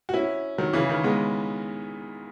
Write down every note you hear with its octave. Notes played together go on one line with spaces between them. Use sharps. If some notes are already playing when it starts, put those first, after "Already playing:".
F#4
C#4 E4
D#3 F#3
C#3 E3
D#3
G#3 B3